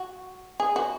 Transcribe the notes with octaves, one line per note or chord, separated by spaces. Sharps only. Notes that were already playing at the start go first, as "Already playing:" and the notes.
Already playing: F#4
G#4
F#4